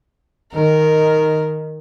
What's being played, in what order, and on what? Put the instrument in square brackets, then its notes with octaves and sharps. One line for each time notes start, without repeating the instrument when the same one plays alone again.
[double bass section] D#3 [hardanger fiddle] A#4